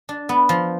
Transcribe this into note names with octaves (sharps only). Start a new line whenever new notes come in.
D4
B3
F3